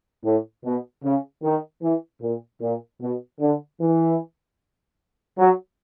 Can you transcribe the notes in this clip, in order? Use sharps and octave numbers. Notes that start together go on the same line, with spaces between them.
A2
B2
C#3
D#3
E3
A#2
A#2
B2
D3
E3
F#3